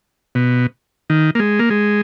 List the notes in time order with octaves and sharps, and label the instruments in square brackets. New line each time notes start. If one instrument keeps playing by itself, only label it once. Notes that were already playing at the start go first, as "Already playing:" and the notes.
[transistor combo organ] B2
D#3
A#3
G#3
A#3
G#3